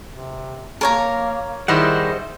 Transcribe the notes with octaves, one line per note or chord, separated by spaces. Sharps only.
C3
A#3 A#4 C#5 A#5
D#3 G3 E4 G#4 C5 D#5 F#5